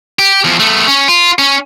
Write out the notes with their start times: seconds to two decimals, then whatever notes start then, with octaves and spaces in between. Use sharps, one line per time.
0.19 G4
0.44 E2 F3
0.60 A3 B3
0.87 C#4
1.08 F4
1.39 C#4